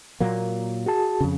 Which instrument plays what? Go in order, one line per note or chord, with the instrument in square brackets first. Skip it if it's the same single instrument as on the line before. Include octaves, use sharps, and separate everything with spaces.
[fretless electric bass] A#2 F#3 A#3
[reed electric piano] F#4 G#4 A5
[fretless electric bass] F2 C#3